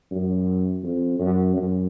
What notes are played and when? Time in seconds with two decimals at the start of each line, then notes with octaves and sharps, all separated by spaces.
0.11 F#2
0.83 F2
1.19 F#2
1.56 F#2